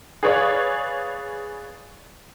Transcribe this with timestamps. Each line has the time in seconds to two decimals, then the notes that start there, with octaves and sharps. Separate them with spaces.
0.23 G#4 B4 C#5 D5 F5